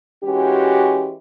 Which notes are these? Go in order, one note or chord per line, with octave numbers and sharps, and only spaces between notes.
E3 G#3 C#4 F#4 G4